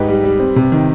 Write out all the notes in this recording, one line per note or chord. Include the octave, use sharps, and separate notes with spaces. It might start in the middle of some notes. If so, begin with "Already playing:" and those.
Already playing: G#2 D#4 G4 B4
G3
G3
C4
C3
D#3